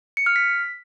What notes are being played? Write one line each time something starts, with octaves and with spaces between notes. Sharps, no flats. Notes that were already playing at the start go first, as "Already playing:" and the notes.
C#7
F6
B6